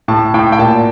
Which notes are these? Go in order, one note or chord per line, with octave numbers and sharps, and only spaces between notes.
A2 A5
A2 G5
G5
A#2 A5